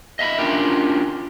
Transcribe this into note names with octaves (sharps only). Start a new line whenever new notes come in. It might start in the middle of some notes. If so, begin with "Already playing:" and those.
D#5 E5 A#5 B5
C#4 D4 F4 G4 A#4